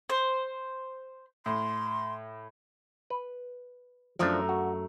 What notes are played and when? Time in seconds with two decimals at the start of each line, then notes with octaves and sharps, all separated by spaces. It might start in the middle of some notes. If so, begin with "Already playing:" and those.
0.10 C5
1.46 A2 C6
3.10 B4
4.19 F#2 F3 A3 D4 A#4
4.49 F#4